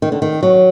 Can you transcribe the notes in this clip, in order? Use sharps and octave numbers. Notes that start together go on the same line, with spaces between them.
D#3
D3
D#3
F#3